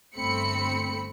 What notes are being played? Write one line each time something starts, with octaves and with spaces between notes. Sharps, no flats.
G1 A3 C4 B5 C#7